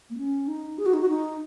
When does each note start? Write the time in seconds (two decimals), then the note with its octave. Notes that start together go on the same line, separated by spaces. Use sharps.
0.10 A#3
0.17 C#4
0.48 D#4
0.78 G#4
0.86 F#4
0.94 D#4
1.01 F#4
1.09 D#4